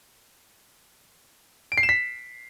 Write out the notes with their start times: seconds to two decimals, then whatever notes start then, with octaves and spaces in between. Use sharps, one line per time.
1.72 D7
1.78 C7
1.83 E7
1.89 B6